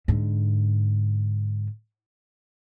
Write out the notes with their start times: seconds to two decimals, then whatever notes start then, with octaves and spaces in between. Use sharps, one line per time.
0.08 G#2 D3